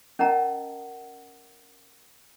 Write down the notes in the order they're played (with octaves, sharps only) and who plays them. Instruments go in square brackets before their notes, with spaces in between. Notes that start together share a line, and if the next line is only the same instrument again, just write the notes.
[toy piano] C#4 A#4 D#5 F#5 A5 A#5